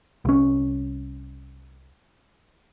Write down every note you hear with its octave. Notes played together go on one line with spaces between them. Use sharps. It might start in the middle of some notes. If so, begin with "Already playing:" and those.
C2 C#4